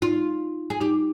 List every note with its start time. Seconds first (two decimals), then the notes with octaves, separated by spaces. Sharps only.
0.02 D#4 F4
0.70 G#4
0.81 D#4 G4